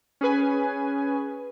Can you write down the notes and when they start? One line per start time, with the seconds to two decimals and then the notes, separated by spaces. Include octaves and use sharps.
0.21 C#4 G#4 B4 G#5